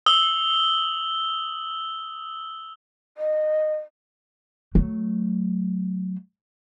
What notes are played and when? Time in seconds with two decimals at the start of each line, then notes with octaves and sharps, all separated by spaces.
0.06 D#6 E6 F#7 G7
3.18 D#5
4.75 F#3 A3